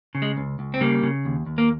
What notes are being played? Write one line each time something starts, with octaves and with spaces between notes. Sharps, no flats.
C#3
G#3
C#2
C#2
C4
C#3 G3 A#3
C#3
D#2
D#2
A#3